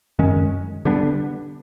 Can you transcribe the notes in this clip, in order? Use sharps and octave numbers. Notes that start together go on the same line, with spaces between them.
F#2 D#3 G#3 C#4
D3 G3 B3 D4